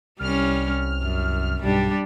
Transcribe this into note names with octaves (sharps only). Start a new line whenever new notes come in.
C2 G3 C#4 F6
F#2
B1 G2 G3 D4 G4